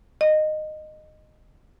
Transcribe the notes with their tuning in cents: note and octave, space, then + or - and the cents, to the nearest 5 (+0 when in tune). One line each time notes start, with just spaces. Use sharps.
D#5 -15